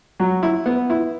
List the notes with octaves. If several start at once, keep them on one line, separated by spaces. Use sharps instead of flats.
F#3
E4
B3
E4